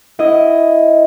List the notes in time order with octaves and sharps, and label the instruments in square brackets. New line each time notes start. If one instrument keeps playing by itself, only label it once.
[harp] E4 D#5